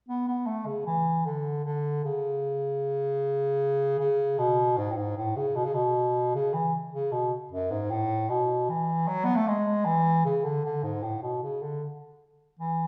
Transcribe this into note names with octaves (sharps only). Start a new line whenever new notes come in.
B3
B3
A3
C#3
E3
D3
D3
C#3
C#3
B2
G#2
A2
G#2
A2
C#3
B2
C#3
B2
C#3
E3
C#3
B2
F#2
G#2
A2
B2
E3
F#3
B3
A3
G#3
E3
C#3
D3
D3
G#2
A2
B2
C#3
D3
E3